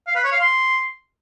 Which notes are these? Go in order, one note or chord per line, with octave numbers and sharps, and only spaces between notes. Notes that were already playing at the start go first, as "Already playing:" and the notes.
F5
B4
C#5
F5
C6